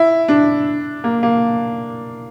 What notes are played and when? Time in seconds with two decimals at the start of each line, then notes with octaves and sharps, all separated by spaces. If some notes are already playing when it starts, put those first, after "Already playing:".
Already playing: E4
0.28 D4
1.04 A#3
1.23 A#3